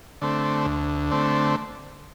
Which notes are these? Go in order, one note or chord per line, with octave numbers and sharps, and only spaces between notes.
D3 A3 C4
D2
D3 A3 C4